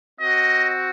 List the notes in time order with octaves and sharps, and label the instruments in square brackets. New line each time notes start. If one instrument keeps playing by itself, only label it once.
[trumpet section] C4 F#4 D#5